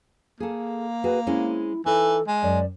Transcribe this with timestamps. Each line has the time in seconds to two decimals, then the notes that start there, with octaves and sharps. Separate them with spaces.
0.40 A#3 G#4 A4
1.04 F#4 G#4 B4
1.27 G#3 C4 C#4 E4
1.86 E3 D#4 A4
2.27 G#3
2.43 F#2 D5